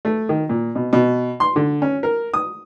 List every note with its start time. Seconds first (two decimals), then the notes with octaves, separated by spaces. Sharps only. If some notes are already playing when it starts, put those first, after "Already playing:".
0.05 A3
0.29 D#3
0.49 A#2
0.75 B2
0.93 B2
1.40 C6
1.56 D3
1.82 C#4
2.03 A#4
2.34 D#6